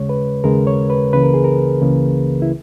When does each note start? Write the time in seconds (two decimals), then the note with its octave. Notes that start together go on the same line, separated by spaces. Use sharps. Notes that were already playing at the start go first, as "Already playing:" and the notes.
Already playing: D#2 C#3 G#3 C#5
0.09 B4
0.44 D#2 C#3 G#3 A#4
0.67 C#5
0.90 B4
1.13 C#2 C#3 E3 A#3 B4
1.23 A#4
1.34 G#4
1.44 A#4
1.81 C#2 C#3 E3 A#3
2.42 E4